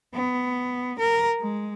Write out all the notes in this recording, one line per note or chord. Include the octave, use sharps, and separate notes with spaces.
B3
A#4
G#3